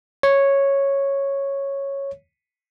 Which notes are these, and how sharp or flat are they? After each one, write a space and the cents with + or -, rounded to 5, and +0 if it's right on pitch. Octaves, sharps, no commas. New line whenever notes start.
C#5 -5